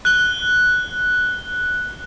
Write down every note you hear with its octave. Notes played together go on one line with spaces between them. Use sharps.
F#6 G7